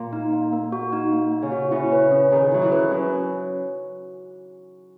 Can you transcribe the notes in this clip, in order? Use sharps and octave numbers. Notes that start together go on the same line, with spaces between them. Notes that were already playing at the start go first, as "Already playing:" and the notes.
Already playing: A#2
D#4
A#3
A#3
F#4
D#4
A#3
A#3
C#3
F#4
C#3 E4
B4
C#4
D#3 G#4
F#3 E4
E3
B4
F#3 C#4